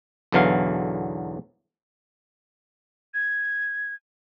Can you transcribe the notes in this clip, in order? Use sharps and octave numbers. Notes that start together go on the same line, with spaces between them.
B1 E2 D3 E3 F#3 F5
G#6